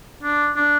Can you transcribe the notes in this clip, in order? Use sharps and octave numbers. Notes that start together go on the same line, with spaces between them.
D4
D4